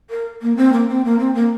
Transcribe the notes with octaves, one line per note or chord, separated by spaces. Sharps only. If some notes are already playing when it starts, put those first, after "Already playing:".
A#4
A#3
C4
A#3
C4
A#3
C4
A#3